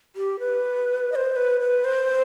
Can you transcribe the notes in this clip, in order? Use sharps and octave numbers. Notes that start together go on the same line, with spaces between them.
G4
B4
D#5
C5
B4
B4
C5